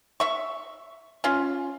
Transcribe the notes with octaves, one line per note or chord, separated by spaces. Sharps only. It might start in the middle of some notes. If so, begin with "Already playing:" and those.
E5 C#6
C#4 F4